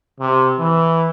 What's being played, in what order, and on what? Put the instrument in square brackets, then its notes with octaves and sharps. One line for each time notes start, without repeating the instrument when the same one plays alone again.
[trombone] C3
E3